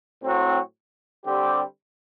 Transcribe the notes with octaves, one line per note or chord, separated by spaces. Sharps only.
A2 F#3 C4 F#4
D3 G3 C4 G4